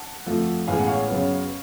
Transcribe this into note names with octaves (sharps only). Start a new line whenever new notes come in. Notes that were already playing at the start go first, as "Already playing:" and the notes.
Already playing: F#5 A5
F2 F3 A3
A1 A2 G#3 B3 F5 G#5
F#5
C#5 F5
F#2 C#3 F#3 B3